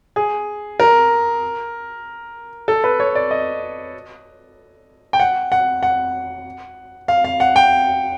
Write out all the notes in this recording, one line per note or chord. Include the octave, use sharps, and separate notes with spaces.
G#4
A#4
A4
B4
C#5
D5
D#5
G5
F#5
F#5
F#5
F5
F5
F#5
G5